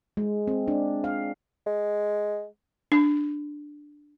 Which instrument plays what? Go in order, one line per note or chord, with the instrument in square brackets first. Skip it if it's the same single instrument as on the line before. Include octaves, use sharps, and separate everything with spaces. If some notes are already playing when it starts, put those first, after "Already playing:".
[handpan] G#3
C4
D4
F5
[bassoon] G#3
[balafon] D4